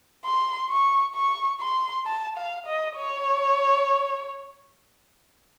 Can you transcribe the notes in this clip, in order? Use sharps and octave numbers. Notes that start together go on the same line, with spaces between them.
C6
C#6
C#6
C6
A5
F5
D#5
C#5